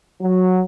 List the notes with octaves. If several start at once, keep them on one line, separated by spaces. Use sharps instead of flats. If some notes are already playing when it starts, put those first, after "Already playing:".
F#3